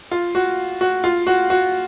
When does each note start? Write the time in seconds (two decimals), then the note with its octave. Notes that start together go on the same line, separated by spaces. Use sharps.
0.11 F4
0.35 F#4
0.81 F#4
1.04 F4
1.27 F#4
1.50 F#4